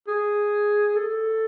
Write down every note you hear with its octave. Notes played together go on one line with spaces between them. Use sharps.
G#4
A4